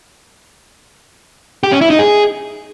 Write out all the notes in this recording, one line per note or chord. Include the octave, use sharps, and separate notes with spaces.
G4
C#4
E4
D#4
G#4